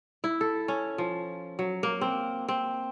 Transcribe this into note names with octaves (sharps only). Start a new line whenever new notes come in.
E4
A4
C#4
F3
F#3
A#3
C4
C4